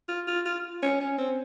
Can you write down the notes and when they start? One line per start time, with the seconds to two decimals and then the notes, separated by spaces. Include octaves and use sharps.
0.08 F4
0.27 F4
0.46 F4
0.83 C#4
1.01 C#4
1.18 C4